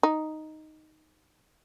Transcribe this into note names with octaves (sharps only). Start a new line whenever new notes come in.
D#4